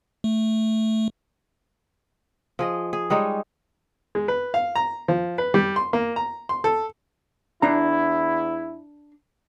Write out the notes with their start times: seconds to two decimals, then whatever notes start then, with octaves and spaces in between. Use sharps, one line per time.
0.24 A3
2.59 F3 G#4 D#5
2.93 G#4
3.10 G3 G#3 D#4 C#5
4.15 G#3
4.28 B4
4.54 F5
4.76 A#5
5.08 F3
5.38 B4
5.54 G3
5.76 C6
5.93 A#3
6.16 A#5
6.49 C6
6.64 A4
7.62 E2 D4 E4 A#5